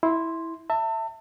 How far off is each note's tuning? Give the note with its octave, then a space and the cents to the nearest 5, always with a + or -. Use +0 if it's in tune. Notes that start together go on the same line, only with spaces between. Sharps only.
E4 -10 C6 +0
E5 +0 A5 +35